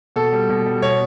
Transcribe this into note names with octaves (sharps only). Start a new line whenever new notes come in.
B2 A4
G3
B2
G3
B2 C#5